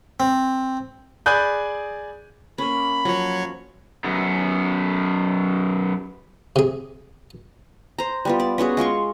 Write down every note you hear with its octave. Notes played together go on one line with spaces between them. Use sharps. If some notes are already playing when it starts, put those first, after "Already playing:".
C4
G#4 D5 G#5 B5 F#6 G6
A#3 C#4 B5
F3 F#3 C#4 C#5
F#2 B3
C3 G#4
C5 A#5
G3 B3 F4
D5
B3 C#4 F#4 G#4
G#3 F4 C6 C#6